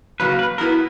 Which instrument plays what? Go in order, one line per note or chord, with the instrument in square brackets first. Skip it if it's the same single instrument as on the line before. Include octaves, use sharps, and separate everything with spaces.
[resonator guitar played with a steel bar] C#3 F#3 A#3 [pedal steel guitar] B4
[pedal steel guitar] B4
[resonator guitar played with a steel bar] F#3 B3 E4 B4 [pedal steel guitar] A#4